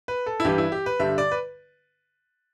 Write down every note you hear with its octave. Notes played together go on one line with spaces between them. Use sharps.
B4
A4
E4
G2 E3 G3 G4
E4
G4
B4
G2 D3 G3 E5
D5
B4